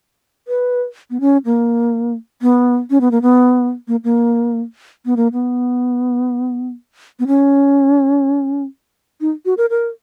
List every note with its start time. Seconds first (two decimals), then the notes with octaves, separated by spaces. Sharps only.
0.48 B4
1.10 B3
1.20 C#4
1.45 A#3
2.42 B3
2.90 C#4
3.01 B3
3.11 A#3
3.22 B3
3.88 A#3
4.04 A#3
5.06 B3
5.16 A#3
5.33 B3
7.19 B3
7.27 C#4
9.21 D#4
9.45 F#4
9.57 A#4
9.70 A#4